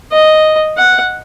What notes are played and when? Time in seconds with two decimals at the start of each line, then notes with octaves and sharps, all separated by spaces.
0.12 D#5
0.77 F#5